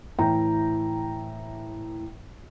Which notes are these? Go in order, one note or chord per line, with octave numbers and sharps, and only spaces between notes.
A2 E3 G5 A#5